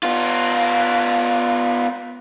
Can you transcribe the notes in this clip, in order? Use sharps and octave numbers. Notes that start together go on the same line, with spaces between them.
B3 F4